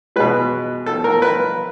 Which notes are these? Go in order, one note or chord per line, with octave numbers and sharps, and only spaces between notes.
B2 G#3 B4
A4
A#4
B4